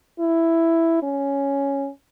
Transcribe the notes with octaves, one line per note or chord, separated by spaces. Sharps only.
E4
C#4